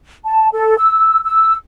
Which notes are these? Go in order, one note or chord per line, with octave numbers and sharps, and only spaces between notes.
A5
A4
E6
E6